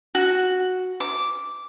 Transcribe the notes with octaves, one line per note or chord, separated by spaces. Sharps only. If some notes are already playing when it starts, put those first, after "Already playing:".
F#4
D6